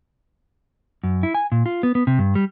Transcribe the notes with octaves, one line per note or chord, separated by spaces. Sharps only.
F#2
E4
G#5
A#2
F4
B3
B3
C3
G2
G3